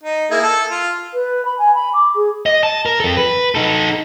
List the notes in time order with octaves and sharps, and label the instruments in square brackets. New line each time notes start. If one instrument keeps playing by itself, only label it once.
[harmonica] D#4
A#3 E4 G#4
A4
F4
[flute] B4
B5
G#5
B5
D6
G#4
[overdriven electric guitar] D#5
A5
A#4
F2 A4
B4
D#4 A4